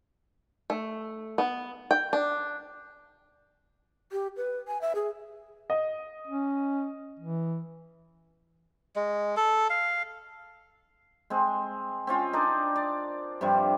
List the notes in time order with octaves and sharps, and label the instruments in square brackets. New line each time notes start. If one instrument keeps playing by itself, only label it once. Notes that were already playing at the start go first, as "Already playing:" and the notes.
[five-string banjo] A3
B3
G5
D4
[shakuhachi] G4
B4
G#5
E5
G#4
[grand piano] D#5
[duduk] C#4
E3
[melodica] G#3
A4
F5
[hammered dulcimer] G#3 C4
C4 C#4 F4
D4 D#4 A#4 D5
D5
G2 C3 F3 G3